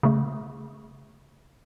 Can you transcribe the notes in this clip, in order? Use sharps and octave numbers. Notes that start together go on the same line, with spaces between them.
C#3 A3